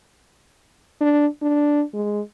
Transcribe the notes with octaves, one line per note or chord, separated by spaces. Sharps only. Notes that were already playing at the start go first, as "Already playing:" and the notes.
D4
D4
G#3